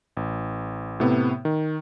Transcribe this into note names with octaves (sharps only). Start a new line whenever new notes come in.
A1
A2 C3 B3
D#3